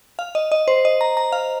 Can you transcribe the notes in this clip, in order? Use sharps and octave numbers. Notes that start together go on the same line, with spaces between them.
F5
D#5
D#5
C5
D#5
A#5
A#5
F5